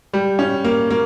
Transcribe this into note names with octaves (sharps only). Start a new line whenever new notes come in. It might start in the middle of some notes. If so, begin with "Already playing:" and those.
G3
C#4
A#3
A#3